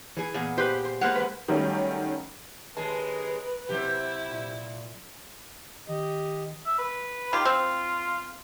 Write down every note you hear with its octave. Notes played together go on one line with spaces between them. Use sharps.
E3 G#4
E2 A#2 B3 G#4
G4 B4 C5
C5
G#3 A#3 B4 C5 F5 F#5
F#2 B4
D#3 F#3 G3 A3 C#4
D#2 G#3 G#4 A#4 B4 A5
C3 F#3 C4 E4 G4
A#2
D#3 G4 D#5
E5
B4
D#3 F4 G4
C4